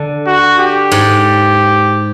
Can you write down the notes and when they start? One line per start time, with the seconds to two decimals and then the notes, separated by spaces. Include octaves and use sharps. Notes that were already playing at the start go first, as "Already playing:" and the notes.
Already playing: D3
0.27 F#4
0.59 G4
0.92 G#2